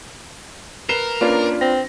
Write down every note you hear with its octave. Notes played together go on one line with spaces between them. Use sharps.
A#4 B4 C7 E7 G7
A#3 C#4 D4 F4 B4
C4 A#6